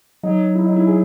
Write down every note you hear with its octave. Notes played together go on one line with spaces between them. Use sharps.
F#3 D#4
E4
D#4
E4
G#4